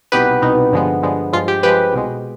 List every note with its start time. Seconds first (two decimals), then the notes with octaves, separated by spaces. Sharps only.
0.12 C2 B2 B3 D#4 G4 B4
0.42 C2 B2 B3 D#4
0.72 G2 D3 F3 G#3 B3
1.03 G2 D3 F3 G#3 B3
1.33 G2 F3 G#3 F4
1.48 G4
1.63 G2 F3 G#3 G4 B4
1.93 C2 B2 G#3